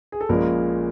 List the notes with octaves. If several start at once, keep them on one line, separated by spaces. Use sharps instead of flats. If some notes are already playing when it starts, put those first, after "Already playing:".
G#4
A4
A#1 A#2 F3 G#3 C#4 A#4